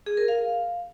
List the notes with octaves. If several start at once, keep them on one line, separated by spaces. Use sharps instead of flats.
G#4
A#4
F5